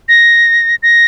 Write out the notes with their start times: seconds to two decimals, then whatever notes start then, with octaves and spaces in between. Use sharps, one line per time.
0.08 A#6
0.83 A#6